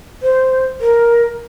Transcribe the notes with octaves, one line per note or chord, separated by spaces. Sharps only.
C5
A#4